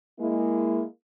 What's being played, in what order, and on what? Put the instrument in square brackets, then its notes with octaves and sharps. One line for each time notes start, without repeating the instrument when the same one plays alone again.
[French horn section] G#3 A#3 E4